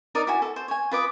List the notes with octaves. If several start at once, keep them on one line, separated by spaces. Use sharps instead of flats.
D#4 A#4 B4 D5
E4 F#4 G#5
A4
C5
C#5 G#5
F4 B4 D6 D#6